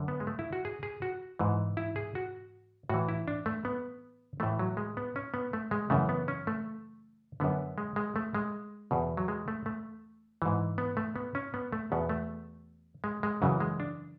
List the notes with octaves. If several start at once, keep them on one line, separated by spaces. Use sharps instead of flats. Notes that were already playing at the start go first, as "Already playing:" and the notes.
Already playing: F#2 D3
B3
G#3
A3
E4
F#4
G#4
G#4
F#4
G#2 E3
E4
G#4
F#4
A2 E3 F#4
E4
D4
A3
B3
A2 E3 A3
F#3
G#3
B3
C#4
B3
A3
G#3
F#2 C#3 E3 A3
B3
C#4
A3
F#2 D3 B3
G#3
G#3
A3
G#3
E2 B2
F#3
G#3
A3
A3
G#2 E3
B3
A3
B3
C#4
B3
A3
E2 B2 B3
A3
G#3
G#3
F#2 C#3 E3 F#3
G#3
D4